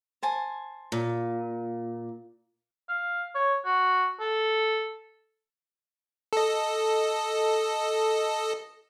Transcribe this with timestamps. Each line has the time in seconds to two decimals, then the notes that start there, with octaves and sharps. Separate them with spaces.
0.23 C5 G#5 A5
0.92 A#2
2.89 F5
3.35 C#5
3.66 F#4
4.20 A4
6.33 A4 D#5